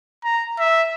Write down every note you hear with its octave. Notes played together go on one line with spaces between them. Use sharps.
A#5
E5